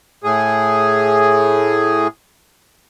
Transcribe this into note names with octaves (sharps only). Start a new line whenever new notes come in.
A2 G#4